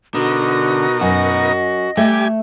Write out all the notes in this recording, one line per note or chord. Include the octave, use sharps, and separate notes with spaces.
B2 D3 D#4 F#4 A#4
F#2 F#4 D#5
G3 A3 G4 G#5